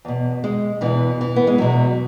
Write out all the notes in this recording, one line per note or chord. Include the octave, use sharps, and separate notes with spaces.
E2 B2
G#3
E2 B2 E3
E3
B3
G#3
E2 B2 F#3